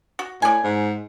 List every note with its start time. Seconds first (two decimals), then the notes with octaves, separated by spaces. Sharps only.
0.19 F#4
0.42 A2 D5 G#5
0.64 G#2